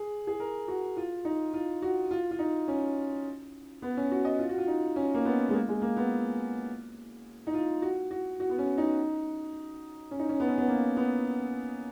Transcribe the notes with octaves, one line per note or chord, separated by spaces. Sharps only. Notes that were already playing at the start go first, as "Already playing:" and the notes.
Already playing: G#4
G#4
A#4
F#4
F4
D#4
F4
F#4
F4
F4
D#4
C#4
B3
C#4
F#4
D#5
F4
F#4
F4
D#4
C#4
A#3
B3
G#3
A#3
G#3
A#3
B3
D#4
F4
F#4
F#4
F#4
B3
C#4
D#4
C#4
D#4
C#4
B3
C#4
B3
A#3
B3